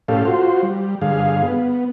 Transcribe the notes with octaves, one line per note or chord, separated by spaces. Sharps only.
A2 C#4 G4 A4 F5
F4 F#4 C5
G3
G2 D3 G#4 F5
B3